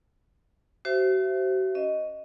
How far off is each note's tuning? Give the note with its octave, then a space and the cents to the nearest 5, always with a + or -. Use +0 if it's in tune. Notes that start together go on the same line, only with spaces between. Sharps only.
F#4 +45 C5 +0 E5 +25
C#4 +20 D#5 +0